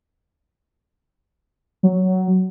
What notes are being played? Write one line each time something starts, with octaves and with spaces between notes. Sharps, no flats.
F#3